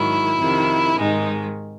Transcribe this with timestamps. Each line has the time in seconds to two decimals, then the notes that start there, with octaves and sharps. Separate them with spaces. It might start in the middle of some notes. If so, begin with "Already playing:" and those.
Already playing: G#2 D#3 F#3 E4
0.37 F2 C3 D#3
0.96 G#2 D#3 G#3 D#4